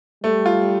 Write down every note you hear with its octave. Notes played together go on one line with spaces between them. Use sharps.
G3 A3
F4